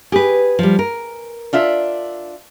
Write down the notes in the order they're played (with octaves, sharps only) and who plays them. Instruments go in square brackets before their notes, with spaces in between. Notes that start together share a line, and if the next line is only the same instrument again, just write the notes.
[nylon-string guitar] G4 B4 [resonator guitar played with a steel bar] G#4
[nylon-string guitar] F3 G3
A#4
[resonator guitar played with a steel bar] D4 F4 E5